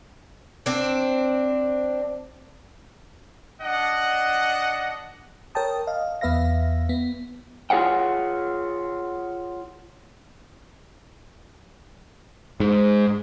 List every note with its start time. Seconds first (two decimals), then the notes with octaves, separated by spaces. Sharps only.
0.66 C4 D4
3.62 D4 D#5 F#5
5.55 A#4 C#5 G5 A5 D#6
5.87 D#5 F5
6.21 E2 B3 B4 E5 F5 A#6
6.89 B3
7.70 F4 G#4 C#5 F#5 G5
12.60 G#2